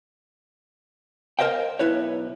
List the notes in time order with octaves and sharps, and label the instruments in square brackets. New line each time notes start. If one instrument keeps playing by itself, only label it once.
[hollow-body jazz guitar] A#4 C5 D#5 F5 G5
B1 E4 B4 C#5